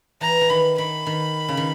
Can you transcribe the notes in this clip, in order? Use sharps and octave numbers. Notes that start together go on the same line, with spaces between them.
E3 A#5
E3
D#3 B5
D#3 B5
D#3
C#3
D#3